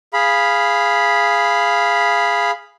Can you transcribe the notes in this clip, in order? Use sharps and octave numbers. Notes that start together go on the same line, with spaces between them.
G#4 F5 B5